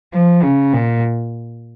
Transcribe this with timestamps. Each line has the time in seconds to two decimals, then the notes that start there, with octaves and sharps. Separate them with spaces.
0.14 F3
0.43 C#3
0.74 A#2